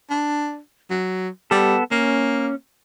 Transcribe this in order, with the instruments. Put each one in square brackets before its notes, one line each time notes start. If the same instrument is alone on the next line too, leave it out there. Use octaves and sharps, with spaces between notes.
[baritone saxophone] D4
F#3
[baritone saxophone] G3 [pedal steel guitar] B3 A4
[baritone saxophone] A#3 [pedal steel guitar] C#4